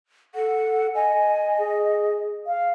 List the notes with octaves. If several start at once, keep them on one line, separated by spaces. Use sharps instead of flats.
A4 F#5
D#5 G#5
G#4
F5